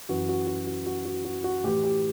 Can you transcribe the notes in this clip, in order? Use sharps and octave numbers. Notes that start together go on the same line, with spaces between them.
F#2 E3 F#4
F#4
F#4
F#4
F#4
F#4
F#4
F#4
A2 E3 G4
G4